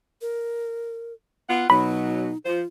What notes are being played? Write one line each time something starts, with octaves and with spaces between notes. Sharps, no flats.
A#4
B3 F4 F#5
B2 F#3 D#4 B5
F3 F4 C5